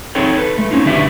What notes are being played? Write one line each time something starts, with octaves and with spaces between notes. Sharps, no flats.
C4 D#4 G#4 A4 C#5 G5
A4 B4
G#3 A3
C4 C#4 D#4 F4
D3 D4 F#4 G4 B4 E5